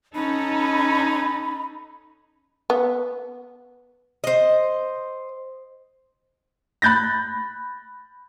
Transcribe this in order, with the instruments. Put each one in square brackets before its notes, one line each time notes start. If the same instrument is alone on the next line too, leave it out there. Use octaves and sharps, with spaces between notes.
[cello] C#4 A4 [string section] D#4 [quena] B5
[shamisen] B3
[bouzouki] C5 D#5
[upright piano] B5 F#6 G6 A6 A#6